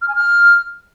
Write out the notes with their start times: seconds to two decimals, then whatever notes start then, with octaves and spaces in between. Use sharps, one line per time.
0.02 F6
0.08 G#5
0.15 F6